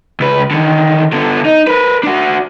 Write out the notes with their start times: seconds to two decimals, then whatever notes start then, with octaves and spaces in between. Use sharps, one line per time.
0.20 C#2 B4
0.51 D3 D#3
1.13 D3 B3
1.45 D#4
1.67 A#4 B4
2.03 D4 F#4